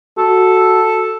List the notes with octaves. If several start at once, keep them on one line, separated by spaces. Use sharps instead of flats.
F#4 A4